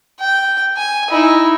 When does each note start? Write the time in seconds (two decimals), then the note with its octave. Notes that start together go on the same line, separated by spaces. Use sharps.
0.20 G5
0.77 G#5
1.10 D#4 E4